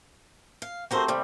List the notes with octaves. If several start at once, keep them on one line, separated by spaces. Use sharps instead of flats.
F5
A3 C4 F#4 G4 A#4 C5
D#2 C3 G3